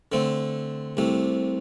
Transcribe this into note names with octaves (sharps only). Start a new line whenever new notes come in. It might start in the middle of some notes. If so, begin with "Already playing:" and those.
D3 A3 C4
C2 C3 A3